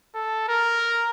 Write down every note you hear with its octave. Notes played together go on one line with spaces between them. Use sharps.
A4
A#4